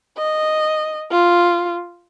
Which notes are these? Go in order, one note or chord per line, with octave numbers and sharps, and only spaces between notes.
D#5
F4